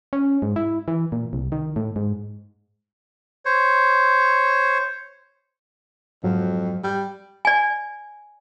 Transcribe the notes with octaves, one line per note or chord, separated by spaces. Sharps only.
C#4
G#2
E4
E3
A#2
C2
D#3
A2
G#2
C5 C#5
F2 G#2 F#3
G3
D5 G#5